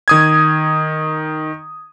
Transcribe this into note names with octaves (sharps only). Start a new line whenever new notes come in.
D#3 D#6 G#6